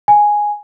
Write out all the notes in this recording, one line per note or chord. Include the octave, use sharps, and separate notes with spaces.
G#5